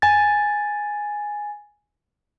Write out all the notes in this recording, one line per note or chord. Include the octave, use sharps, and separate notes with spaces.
G#5 A6